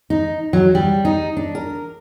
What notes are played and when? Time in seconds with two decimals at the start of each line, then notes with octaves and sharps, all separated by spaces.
0.10 D#4
0.53 F#3
0.75 G3
1.05 D#4
1.37 D4
1.55 A#4